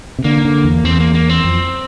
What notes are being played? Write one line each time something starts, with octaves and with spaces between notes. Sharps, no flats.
C3
D3 A#3
D3
E2
E2 C4
A#3
A#3
C4
F2